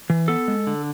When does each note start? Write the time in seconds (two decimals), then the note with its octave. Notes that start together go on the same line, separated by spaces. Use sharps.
0.10 E3
0.28 B3 A4
0.48 G#3
0.67 D3